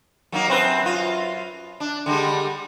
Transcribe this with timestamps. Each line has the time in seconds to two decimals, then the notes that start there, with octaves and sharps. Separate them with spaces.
0.32 F#3 A#3 D#4
0.48 F#2 C4 B4
0.82 F#2 F4
1.80 D4
2.06 D3 G3 G#3